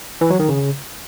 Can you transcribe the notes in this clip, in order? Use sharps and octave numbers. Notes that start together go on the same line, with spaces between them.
E3
F#3
D#3
C#3